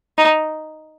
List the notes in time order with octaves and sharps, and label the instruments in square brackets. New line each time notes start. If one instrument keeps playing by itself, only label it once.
[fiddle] D#4